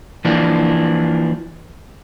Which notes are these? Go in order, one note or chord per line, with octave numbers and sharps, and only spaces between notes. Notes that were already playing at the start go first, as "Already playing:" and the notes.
E3 F3 A#3 D4